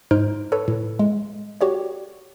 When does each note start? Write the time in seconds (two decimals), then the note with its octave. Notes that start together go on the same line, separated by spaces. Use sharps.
0.11 G#2 D#4 C5 F6 G6 D7
0.52 A4 B4 C#5
0.68 A2
0.99 G#3
1.61 F#4 G4 C#5 D5